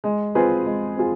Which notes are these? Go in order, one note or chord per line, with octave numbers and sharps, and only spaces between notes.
G#3
C4 F4 G#4 B4
G#3
C4 F4 G#4